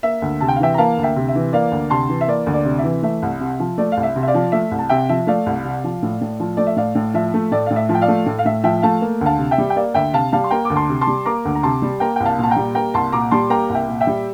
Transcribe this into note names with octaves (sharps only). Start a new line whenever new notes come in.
A#3 E5
D2
C3 A5
G5
F5
E3 E5 G5
A#5
A#3 F5 A5
D2
E5 G5
C3
E5
E3
A#3 D5 F5
D2
C3 A5 C6
E3
E5
A#3 D5
D2
D5
C3
E5
E3
A3 E5
C2
C3
F3
A3 D5
C2 F5
E5
C3
E5
D5 F5
F3
A3 E5
C2
A5
C3 E5 G5
F3 E5
A3 D5 F5
C2
C3
F3
A2
A2
F3
A3 D5
E5
A2 D5 F5
A2
F3 E5
A3
A2 D5
A2 F5
E5
F3
G5
D5 F5
A3
A2
F5
A2 E5
F3 E5 G5
A3 F5 A5
A#3
D2
F5 A5
C3
E5 G5
G3
G5
A#3 D5 F5
D2 E5 G5
C3 F5 A5
G3 F5 A5
C6
A#3 G5 A#5
D2 D6
A5 C6
C3
A5 C6
G3
A#3 A#5 D6
D2
A#5
C3 A5 C6
G3
A#3 G5 A#5
C2 G5
F5 A5
A#2
A5
G5 A#5
G3
A#3 G5 A#5
C2 A5 C6
A#2 A#5 D6
G3 A5 C6
A#3 G5 A#5
C2
E5 G5
A#2
E5 G5
G3